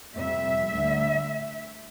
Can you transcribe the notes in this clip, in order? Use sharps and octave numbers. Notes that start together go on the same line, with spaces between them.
F2 C3 G3 E5
D2 D3 G3